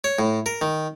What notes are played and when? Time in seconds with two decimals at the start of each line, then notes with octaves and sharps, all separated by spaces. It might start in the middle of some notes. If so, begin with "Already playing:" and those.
0.04 C#5
0.19 A2
0.46 A#4
0.61 D#3